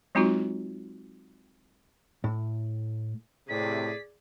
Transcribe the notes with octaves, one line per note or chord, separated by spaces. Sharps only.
F#3 G#3 C4 D#4 F4 F#4
A2
A2 C3 G#4 D5 B6